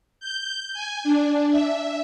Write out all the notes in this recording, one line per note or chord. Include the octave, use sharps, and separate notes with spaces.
G6
G#5
D4
E5